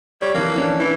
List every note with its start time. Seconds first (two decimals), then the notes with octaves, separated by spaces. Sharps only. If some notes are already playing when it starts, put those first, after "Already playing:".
0.22 G3 C#5
0.34 F2 E3 A#3
0.56 E3 C#4 D4
0.80 E3 E4